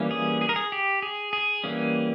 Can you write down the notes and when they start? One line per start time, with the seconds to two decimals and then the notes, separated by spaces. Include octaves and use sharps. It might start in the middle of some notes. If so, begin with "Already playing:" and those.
Already playing: E3 G3 A#3 C#4
0.11 G#4
0.41 G#4
0.49 A#4
0.56 G#4
0.72 G4
1.02 G#4
1.33 G#4
1.64 E3 G3 A#3 C#4